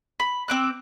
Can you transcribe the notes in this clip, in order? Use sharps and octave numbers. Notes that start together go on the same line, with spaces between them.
B5
C4 D6 F#6